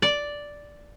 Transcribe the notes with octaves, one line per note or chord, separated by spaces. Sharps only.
D5